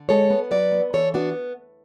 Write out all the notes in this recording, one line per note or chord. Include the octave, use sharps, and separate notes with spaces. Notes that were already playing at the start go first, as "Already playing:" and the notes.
Already playing: D3
G#3 A4 C#5
B3
F#3 B4 D5
B3
E3 A4 C#5
B3 D4 F#4